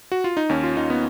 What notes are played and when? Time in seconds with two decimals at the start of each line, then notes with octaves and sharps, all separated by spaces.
0.12 F#4
0.24 F4
0.37 D#4
0.49 D#2 C#4
0.63 F4
0.77 D#2 D#4
0.90 B3